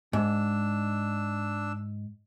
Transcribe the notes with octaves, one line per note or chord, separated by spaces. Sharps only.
G#2 D4 E6